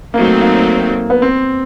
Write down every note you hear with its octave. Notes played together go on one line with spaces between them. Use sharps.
F#3 A3 A#3 C4 D#4
A#3
B3
C4